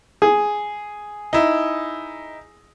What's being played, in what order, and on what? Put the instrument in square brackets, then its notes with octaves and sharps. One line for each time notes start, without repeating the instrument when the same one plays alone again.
[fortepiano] G#4
[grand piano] D#4 E4